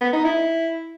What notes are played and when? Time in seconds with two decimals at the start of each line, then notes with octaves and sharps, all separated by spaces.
0.01 B3
0.13 D#4
0.25 E4